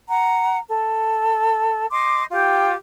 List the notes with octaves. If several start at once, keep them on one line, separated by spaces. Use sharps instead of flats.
F#5 A#5
A4
D#5 C6 D6
F4 G4 G5